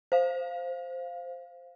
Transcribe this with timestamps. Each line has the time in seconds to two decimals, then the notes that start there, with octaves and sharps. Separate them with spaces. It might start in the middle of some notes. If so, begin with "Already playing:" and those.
0.12 C5 F5